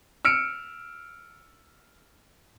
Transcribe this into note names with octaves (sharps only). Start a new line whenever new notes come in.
E6 F6 C#7 D7